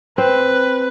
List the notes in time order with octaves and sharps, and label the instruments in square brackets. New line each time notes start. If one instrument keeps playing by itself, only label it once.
[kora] C4 [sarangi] B4